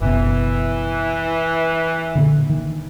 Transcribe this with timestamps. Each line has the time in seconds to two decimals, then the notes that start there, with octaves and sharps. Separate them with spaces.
0.01 F#1 B2 E3
2.15 A#2 D3
2.50 D#3